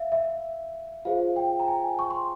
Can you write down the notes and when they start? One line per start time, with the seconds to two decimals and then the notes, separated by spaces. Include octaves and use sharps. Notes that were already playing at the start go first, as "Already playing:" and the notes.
Already playing: E5 F5
0.12 E5
1.05 F4 G#4 C5 F5
1.36 G5
1.60 A#5
1.68 G#5
1.99 C#6
2.11 C6